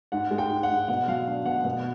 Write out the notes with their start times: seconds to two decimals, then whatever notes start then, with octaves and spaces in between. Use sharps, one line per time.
0.12 G#2 F#5
0.31 G#3
0.38 G5
0.51 G#2
0.63 F#5
0.70 G#2
0.88 B2 F#5
1.08 F#3 F5
1.27 D4 F5
1.46 B2 F#5
1.65 B2 F#5